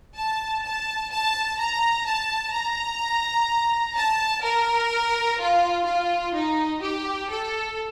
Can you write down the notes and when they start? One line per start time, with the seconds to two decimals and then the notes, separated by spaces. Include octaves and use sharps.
0.16 A5
0.64 A5
1.11 A5
1.59 A#5
2.06 A5
2.53 A#5
3.96 A5
4.43 A#4
5.39 F4
5.87 F4
6.33 D#4
6.81 G4
7.29 A4